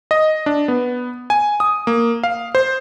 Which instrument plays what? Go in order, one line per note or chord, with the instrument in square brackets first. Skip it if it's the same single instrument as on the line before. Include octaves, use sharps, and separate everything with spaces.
[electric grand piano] D#5
D4
B3
G#5
D#6
A#3
F5
C5